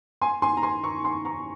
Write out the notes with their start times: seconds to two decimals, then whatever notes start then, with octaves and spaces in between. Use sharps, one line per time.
0.21 G#5 C6
0.42 G#5 C6
0.57 A#5
0.63 G#5 C6
0.84 A#5 C#6
1.04 G#5 C6
1.25 A#5 C#6